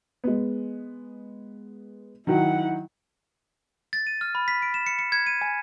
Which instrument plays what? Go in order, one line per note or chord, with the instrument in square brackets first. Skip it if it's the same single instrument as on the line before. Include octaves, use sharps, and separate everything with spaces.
[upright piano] G#3 B3
[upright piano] D#3 F#3 [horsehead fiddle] E4 F#5
[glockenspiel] A6
D#7
F6
B5
B6
D7
E7
C#7
C#7
G#6
D#7
G#5